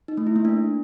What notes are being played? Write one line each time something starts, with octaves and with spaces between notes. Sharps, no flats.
D#4
A3
E4
A#3
D4